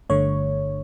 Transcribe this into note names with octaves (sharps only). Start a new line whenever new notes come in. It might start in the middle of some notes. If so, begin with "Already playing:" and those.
G1 G2 D3 A3 C#5